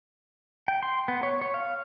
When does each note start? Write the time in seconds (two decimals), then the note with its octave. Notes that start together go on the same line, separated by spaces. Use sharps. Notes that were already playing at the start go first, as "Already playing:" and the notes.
0.68 G5
0.83 C6
1.08 B3
1.23 C#5
1.42 C#5
1.54 F5